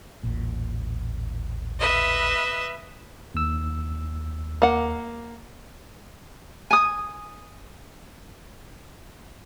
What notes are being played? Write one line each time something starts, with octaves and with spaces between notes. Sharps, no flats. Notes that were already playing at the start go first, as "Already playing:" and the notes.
D#1 A1 A#2
B4 D#5 E5
D#2 E6
A#3 F#5
G#5 D#6